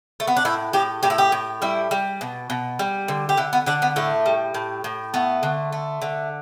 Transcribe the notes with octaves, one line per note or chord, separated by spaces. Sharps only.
A3
B3
D4
A2 E4
A2 G4
A2 G4
E4
G4
A2
G3 E4
G3
B2
B2
G3
D3
G4
D3 E4
B3
D3 D4
B3
A2 A3
G3
A2
A2
A3 B3
D3
A3
D3